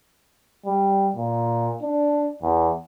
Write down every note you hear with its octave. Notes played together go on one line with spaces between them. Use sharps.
G3
A#2
D4
E2